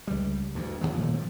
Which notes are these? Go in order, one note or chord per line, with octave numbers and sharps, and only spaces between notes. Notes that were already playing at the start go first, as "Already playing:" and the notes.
C#2 G3
D2 G2
A#2 D3 F3 G#3
D#1 G#1 A#2 A3
G2 F3 C4